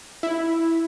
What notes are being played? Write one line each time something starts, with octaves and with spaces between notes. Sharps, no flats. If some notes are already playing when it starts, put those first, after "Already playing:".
E4